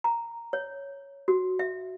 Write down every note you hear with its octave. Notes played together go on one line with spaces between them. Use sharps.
A#5
C#5
F#4
E5